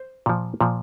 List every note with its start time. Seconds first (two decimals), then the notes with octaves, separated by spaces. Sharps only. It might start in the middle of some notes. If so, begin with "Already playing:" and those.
Already playing: C5
0.26 A#2 F3
0.61 A#2 F3